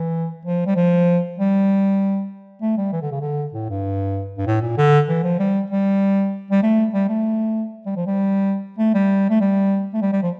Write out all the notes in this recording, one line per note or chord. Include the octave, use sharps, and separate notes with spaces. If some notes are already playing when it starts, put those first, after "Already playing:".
Already playing: E3
F3
G3
F3
G3
A3
G3
E3
D3
C#3
D3
A2
G2
G2
A2
A#2
D3
E3
F3
G3
G3
G3
A3
G3
A3
G3
F3
G3
A3
G3
A3
G3
A3
G3
G3
F3